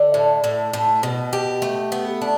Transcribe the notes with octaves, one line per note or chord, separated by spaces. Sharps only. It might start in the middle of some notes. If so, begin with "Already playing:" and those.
Already playing: D3
A2
A2
A2
B2
G4
A3
B3
D4